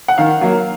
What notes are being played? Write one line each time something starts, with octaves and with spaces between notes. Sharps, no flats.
F#5
D#3 F5
F#3 A#3